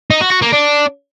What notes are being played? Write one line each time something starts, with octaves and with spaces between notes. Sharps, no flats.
D#4
F#4
F#4
A#3
D4